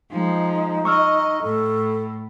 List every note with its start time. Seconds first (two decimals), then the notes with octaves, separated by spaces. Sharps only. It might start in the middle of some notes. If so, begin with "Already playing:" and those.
0.11 F3 G#3 D#4
0.85 D#5 C#6 E6 F6
1.42 A2 A4